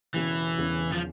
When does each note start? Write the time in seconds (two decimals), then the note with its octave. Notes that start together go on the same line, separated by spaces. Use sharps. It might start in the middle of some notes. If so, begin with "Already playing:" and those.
0.14 E1 E2 C#3 E3
0.58 E1 E2 C#3
0.92 F3